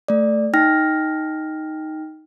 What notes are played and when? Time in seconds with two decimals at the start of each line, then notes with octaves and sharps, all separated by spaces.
0.08 A3 D5
0.53 D#4 G5 F6 A#6